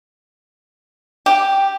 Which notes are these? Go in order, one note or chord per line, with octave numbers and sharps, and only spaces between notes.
G4